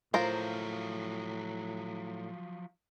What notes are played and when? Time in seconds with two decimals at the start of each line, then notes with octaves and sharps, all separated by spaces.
0.14 A2 F3 F#3 F4 A#4 C5